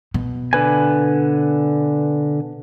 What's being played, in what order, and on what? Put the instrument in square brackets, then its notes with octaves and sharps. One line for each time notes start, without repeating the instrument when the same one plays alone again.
[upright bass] B2
[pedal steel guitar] D3 B4 G#5